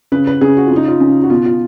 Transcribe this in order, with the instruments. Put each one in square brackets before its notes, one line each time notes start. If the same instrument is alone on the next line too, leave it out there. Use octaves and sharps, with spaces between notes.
[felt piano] C#3 B4
B4
C#3 G#4
F#4
C#3 F4
D#4
F4
C#3
F#4
B2 F4
F4